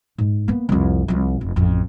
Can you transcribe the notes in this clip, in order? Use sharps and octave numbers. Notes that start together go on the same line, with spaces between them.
G#2
A#3 B3
C2 F2
C2 F3
F1
A1 F2